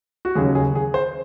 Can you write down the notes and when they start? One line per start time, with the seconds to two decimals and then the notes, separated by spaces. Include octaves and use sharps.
0.25 F#4
0.35 D#2 C#3 F#3 G#4
0.55 G#4
0.75 G#4
0.94 C5